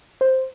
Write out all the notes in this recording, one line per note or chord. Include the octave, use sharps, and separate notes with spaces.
C5